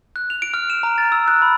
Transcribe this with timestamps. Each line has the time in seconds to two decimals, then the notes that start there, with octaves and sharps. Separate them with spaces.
0.16 F#6
0.30 F7
0.42 D7
0.54 F6
0.70 E7
0.83 A#5
0.98 A6
1.12 E6
1.28 F#6
1.42 B5